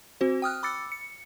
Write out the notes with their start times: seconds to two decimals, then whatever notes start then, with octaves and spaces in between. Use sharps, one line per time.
0.21 C4 F#4 C5
0.42 G5 D#6 F6 F#6
0.63 B5 D6 E6 A6 C#7
0.92 C#7